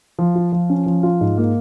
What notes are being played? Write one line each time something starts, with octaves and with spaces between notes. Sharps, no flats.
F3
F4
F3
C#4
F3
F4
G#2
A#3